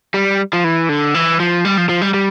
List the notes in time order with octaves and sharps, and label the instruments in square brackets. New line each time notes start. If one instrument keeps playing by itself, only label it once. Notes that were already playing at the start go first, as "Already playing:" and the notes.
[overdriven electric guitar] G3
F3
E3
D3
E3
F3
G3
F3
F3
G3
G3